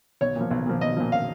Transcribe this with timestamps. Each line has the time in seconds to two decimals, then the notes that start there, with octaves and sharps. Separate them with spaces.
0.21 B1 C#5
0.36 A#2 F3
0.51 B1
0.66 A#2 F3
0.81 B1 D#5
0.97 A#2 F3
1.12 F5